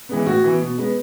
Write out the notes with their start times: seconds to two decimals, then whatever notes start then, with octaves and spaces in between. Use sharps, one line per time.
0.09 E3 G#3 B3
0.26 A2 F#4
0.44 E3 B3
0.61 B2
0.78 G#3 B3